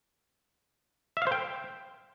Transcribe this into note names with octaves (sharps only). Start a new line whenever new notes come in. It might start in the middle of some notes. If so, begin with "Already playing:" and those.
E5
F5
C5
G5